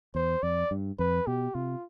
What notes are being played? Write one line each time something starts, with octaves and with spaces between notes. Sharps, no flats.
E2 C5
F2 D5
G2
F2 B4
B2 G4
C3 F4